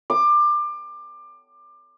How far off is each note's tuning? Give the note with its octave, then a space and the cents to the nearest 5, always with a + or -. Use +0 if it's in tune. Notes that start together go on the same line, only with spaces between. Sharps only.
D6 +25